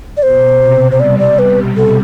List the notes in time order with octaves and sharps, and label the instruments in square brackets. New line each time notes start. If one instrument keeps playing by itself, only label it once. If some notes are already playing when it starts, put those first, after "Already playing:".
[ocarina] D5
[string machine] B2 [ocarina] C5
[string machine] C3
[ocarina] C5
[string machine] G3 [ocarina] D5
[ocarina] D5
B4
A4